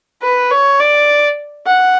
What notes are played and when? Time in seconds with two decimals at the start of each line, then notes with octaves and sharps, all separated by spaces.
0.22 B4
0.51 C#5
0.80 D5
1.66 F#5